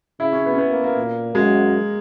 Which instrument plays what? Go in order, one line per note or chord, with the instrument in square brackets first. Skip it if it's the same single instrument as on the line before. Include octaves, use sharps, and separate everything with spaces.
[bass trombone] C#3 [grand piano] E4
[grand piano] C#4
B3
C#4
B3
A#3
A#3
[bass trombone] A#2
[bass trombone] F#2 [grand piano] G#3